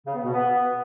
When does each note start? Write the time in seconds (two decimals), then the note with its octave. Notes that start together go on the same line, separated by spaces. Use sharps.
0.06 C#3
0.15 B3
0.24 B2
0.33 B3